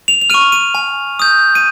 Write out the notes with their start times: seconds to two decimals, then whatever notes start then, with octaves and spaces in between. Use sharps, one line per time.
0.08 F7
0.21 F7
0.30 F6 D#7
0.34 C#6
0.52 D#7
0.75 G#5
1.19 D#6 G6
1.55 D#7